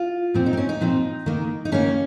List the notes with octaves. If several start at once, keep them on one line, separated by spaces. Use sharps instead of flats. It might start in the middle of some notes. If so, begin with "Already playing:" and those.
Already playing: F4
A#2 F3 C4
D#4
C4
C#4
D#4
A#2 F3 C4
D#3 A#3
D#4
D#3 A#3 C#4